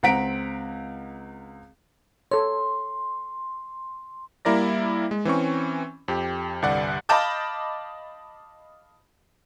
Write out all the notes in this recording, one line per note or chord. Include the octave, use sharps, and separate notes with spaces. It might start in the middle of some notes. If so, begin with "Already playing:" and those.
C#2 C4 F#5 A#5 B6 D7
A4 C#5 C6
G3 A#3 E4 A#4 D5 A#6
G#3
E3 C4 C#4 C#6
F2 G4
C2 G2 D3 D5 F#5 F#6
D#5 F5 A5 B5 D6 G6